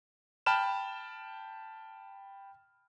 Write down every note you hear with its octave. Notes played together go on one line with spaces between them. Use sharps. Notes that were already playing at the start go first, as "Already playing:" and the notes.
G5 A5 B5 F6 E7